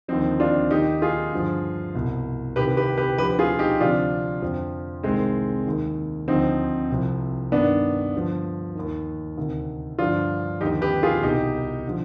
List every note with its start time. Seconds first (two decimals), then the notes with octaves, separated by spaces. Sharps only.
0.08 D#2 D3 F3 C4 D#4
0.40 D4 F4
0.71 D#2 D#3 D#4 G4
1.02 F4 G#4
1.32 G2 D3 F3
1.95 C2 B2
2.56 C2 C3 D#3 G4 B4
2.77 G4 B4
2.98 G4 B4
3.18 D2 D3 F3 G4 B4
3.39 F4 G#4
3.59 D#4 G4
3.80 D2 C3 F3 D4 F4
4.42 F2 D3 F3
5.03 C2 C3 D#3 G#3 C4
5.66 D#2 D#3
6.28 D2 D3 F3 C4 D#4
6.90 C2 C3 F3
7.52 G2 D#3 B3 D4
8.14 G2 D3 F3
8.75 D#2 D#3
9.37 D2 C3 D#3
9.99 G2 D3 F3 D4 F4
10.61 D#2 D3 F3 D#4 G4
10.81 G4 B4
11.03 F4 G#4
11.23 C2 B2 D#4 G4
11.87 D3 F3